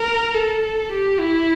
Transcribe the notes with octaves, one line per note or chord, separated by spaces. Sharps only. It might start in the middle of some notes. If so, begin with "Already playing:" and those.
Already playing: A#4
A4
G4
E4